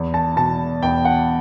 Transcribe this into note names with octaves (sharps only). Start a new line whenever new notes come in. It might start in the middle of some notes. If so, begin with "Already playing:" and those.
Already playing: E2
A5
B2 A5
E2 G5
F#5